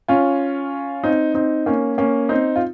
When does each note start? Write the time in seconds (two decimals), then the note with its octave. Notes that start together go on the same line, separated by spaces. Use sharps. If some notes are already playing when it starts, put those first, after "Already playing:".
0.08 C#4 F4
1.04 C4 D#4
1.34 C4 D#4
1.66 A#3 C#4
1.98 A#3 C#4
2.29 C4 D#4
2.56 F4